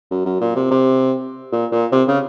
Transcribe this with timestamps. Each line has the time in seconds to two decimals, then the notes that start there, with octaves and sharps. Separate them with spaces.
0.11 F#2
0.25 F#2
0.41 A#2
0.56 C3
0.71 C3
1.52 A#2
1.72 A#2
1.92 C3
2.08 C#3